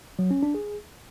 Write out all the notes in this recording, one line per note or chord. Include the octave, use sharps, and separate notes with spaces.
F#3
C#4
D4
G#4